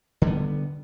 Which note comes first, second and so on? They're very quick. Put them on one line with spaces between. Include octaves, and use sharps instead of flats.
D3 G3 B3